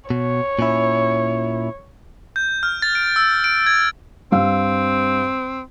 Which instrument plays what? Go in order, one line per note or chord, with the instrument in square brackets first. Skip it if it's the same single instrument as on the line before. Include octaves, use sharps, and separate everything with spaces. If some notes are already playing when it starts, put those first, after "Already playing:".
[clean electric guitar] B2 [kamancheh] C#5
[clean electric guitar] A#2 C#4 E4
[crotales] G6
F6
A6
D7
E6
D7
G#6
[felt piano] G2 F5 E6 [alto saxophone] C4